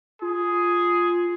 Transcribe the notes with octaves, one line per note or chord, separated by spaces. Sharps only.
F4 G#4